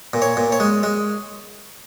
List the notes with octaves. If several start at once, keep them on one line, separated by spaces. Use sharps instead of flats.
A#2
C#5
A#2
C#5
G#3
G#3